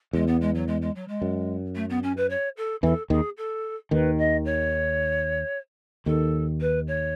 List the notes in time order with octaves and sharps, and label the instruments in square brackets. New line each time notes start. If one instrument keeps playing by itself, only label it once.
[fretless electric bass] E2 [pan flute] G#3
[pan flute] B3
G#3
F#3
G#3
G#3
F#3
G#3
[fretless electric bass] F#2
[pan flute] A3
B3
C#4
B4
C#5
A4
[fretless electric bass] E2 E3 [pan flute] A4
[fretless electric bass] D#2 D#3 [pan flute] G#4
[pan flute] A4
[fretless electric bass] D#2 D#3 [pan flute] B4
[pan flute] D#5
C#5
[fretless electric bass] D#2 D#3 [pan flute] A4
[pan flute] B4
C#5